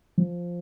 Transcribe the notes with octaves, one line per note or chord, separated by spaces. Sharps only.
F3